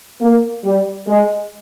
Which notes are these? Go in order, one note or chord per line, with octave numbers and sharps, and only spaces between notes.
A#3
G3
G#3